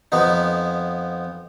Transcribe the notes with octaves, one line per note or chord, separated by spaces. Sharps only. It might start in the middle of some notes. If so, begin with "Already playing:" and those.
F2 F3 B3 D#4